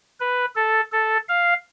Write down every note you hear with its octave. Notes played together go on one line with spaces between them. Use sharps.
B4
A4
A4
F5